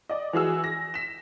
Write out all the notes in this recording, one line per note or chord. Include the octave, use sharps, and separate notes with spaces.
D5 D#5
E3 F#4 G#4 E6
A#6
B6 E7